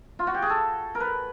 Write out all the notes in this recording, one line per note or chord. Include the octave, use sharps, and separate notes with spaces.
F4
F#4
G4
G#4
A4
A#4
B4